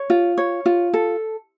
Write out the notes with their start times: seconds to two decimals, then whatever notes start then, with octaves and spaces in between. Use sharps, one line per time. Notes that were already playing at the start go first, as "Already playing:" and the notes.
Already playing: C#5
0.10 F4
0.38 C#5
0.66 F4
0.94 A4